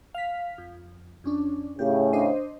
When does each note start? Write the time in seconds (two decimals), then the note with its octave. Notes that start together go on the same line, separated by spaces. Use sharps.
0.14 F5 B6
0.58 F2
1.24 F2 C#4 D4
1.79 A2 C#3 G4
2.13 D4 C5 D#5